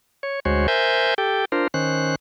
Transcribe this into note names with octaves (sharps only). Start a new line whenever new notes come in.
C#5
D2 G#3 F#4 C5 C#5
A#4 C5 E5 G#5 G6
G4 A4 G5
D4 F4 A#4 C5
D#3 C#4 C5 F#6